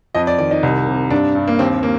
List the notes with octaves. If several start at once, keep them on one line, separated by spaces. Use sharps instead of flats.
F2 D#5
D5
D#3 D5
D#4
C2
C3
G2 D4
G2
A#3
D#2 C4
A#3